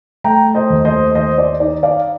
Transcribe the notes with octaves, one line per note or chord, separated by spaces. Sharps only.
A3 G5 A#5
C5 D#5
D#2
C5 D#5
D#3 C5 D#5
D5
D#4 D5
D5 F5